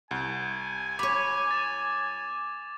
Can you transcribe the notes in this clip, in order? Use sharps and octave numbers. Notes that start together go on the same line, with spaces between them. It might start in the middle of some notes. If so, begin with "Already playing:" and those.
C2 G#5
C#5 B5 D6
A6 E7